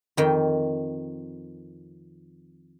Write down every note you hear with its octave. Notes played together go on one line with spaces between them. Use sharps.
F2 D#3 G5